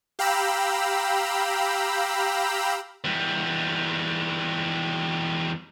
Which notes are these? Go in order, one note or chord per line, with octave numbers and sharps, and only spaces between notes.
G4 F5 G5 A#5 B5 E6
E2 G3